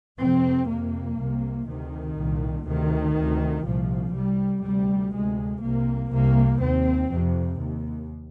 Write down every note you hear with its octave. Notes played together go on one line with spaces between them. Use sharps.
F2 C3 C4
F2 C3 A#3
C2 C3
D2 C3 D#3
C2 A#2
D2 C3 D#3
D2 C3
C2 A#2 F3
C2 C3 G3
D2 C3 G3
D2 C3 G#3
C2 C3 A#3
C2 C3 A#3
D#2 C4
F2 C3
D#2